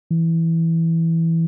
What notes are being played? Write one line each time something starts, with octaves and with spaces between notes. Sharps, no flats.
E3